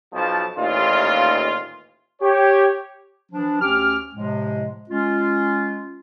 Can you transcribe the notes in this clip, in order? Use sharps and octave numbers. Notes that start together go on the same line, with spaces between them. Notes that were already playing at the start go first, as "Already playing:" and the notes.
B1 F3 A5
A1 D#2 A#2 E3 D#4 F4
G4 C#5
E3 F3 D4
D2 C#4 G4 D6 F6
A2 C3 F3 G#3
G#3 C#4 F4